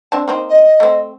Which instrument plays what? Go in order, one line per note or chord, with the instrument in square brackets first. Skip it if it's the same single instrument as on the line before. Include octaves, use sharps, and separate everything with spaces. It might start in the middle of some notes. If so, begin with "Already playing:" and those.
[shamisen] C4 D4 A5
A#3 C4 D#4
[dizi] D#5
[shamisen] A3 C4